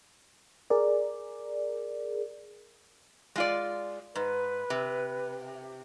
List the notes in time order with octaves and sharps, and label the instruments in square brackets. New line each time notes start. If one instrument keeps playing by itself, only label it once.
[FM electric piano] G#4 A#4 D5
[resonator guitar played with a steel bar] G#3 F4 D5
[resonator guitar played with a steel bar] G#2 [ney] B4
[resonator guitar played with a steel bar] C3